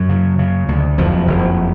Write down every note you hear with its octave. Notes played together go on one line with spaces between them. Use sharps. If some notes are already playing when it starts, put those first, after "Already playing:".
Already playing: F#2 F#3
C#3
C#3
D2
F#1 F2 F3
F#1